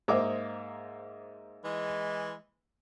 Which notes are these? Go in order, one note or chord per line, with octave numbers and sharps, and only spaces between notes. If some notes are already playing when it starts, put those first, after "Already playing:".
G#2 A#3 C5 D#5 E5 D6
E3 G#3